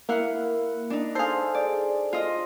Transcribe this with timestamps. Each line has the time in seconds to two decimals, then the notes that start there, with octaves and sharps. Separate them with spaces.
0.09 A#3 E4 F5 F#5
0.90 D4 D#4
1.15 G#4 A4 C5 F5
1.54 D5
2.13 F4 D#5